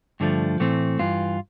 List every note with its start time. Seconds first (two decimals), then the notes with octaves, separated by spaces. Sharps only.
0.20 G2 D3 F3 A3
0.60 A2 E3 A3 C4
0.99 G2 E3 F4